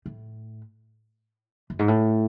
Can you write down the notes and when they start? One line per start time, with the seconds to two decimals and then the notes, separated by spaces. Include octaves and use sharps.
0.06 A2
1.70 F#2
1.79 G#2
1.88 A2